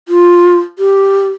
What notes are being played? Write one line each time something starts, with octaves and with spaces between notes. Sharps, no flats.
F4
G4